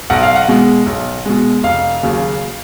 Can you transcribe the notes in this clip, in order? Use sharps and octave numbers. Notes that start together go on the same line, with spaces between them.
B1 F#5
F5
F#5
B2 G#3
B1
B2 G#3
F1 F5
D#2 C#3 F#3